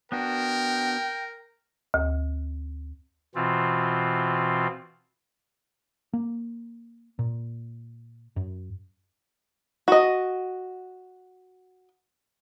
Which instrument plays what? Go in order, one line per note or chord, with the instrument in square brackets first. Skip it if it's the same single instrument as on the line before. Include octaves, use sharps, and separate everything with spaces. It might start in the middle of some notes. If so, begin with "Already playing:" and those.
[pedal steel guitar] B3 D4 F#4 [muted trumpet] A#4 [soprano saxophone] G5
[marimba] D2
[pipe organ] B2 E3 C4 F4
[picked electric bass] A#3
A#2
F#2
[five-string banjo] F#4 D#5